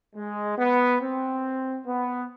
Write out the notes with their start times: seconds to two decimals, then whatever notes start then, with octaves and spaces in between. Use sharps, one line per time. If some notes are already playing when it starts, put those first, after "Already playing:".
0.15 G#3
0.57 B3
1.00 C4
1.86 B3